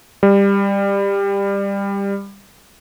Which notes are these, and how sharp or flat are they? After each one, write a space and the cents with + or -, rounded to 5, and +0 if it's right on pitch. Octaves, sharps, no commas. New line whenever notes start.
G3 +20